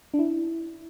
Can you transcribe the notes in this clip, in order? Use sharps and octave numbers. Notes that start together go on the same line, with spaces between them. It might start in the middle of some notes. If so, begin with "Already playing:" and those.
D4
E4